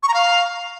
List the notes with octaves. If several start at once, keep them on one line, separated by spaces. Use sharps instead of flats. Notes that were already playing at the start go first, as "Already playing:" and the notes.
C#6
A#5
F5